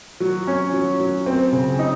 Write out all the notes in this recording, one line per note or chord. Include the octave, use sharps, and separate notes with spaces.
F#3
C#4
F#3
F#3
C4
C#3
D#4